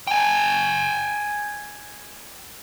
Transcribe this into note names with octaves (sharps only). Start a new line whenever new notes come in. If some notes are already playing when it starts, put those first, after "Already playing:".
G5 G#5